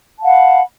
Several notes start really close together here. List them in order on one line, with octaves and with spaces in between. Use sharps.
A5 F5 F#5 B5